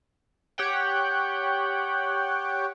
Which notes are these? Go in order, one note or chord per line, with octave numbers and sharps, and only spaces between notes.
G4 C#5 F#5 G5